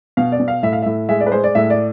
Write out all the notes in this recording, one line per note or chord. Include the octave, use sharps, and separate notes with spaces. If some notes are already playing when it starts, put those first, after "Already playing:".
B2 F5
D5
B2
F5
A2 E5
F5
A2 E5
G#3 E5
D5
B4
G#3 C5
D5
A2 E5
D5